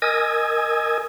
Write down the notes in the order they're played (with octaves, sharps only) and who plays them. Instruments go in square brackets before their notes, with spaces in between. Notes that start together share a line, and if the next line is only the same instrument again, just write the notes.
[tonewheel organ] A#4 D#5 G#5 D#6 E6 G#6